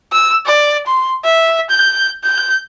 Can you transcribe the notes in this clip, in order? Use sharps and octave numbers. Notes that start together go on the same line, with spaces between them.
E6
D5
C6
E5
G6
G6